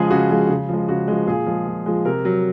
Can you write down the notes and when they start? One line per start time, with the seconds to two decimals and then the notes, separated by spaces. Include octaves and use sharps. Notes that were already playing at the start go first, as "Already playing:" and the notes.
Already playing: C#3 F3 G#3 G#4
0.10 C#3 F#4
0.30 F3 G#3
0.50 C#3
0.69 F3 G#3
0.89 C#3 F#4
1.08 F3 G#3
1.27 A#2 G#4
1.46 F3 G#3
1.66 A#2
1.86 F3 G#3
2.05 C3 A#4
2.25 F#3